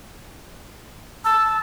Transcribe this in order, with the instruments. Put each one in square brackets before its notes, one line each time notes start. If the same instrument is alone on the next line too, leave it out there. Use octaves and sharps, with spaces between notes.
[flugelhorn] A5 [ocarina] E6